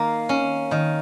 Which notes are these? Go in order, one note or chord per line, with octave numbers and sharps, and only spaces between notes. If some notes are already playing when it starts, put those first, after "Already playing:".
Already playing: D#3 A#3
C#4
D#3